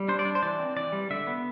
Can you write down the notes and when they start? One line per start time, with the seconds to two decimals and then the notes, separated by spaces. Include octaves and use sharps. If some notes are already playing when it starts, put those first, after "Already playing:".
Already playing: G3
0.08 D4 C5
0.19 D5
0.25 D4
0.35 C5
0.42 E3 D5
0.59 C4
0.77 E3 D5
0.93 G3
1.10 D3 E5
1.27 B3